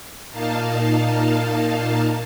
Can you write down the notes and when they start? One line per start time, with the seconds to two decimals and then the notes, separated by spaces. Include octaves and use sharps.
0.31 A#2 A#3 D#4 F5 A5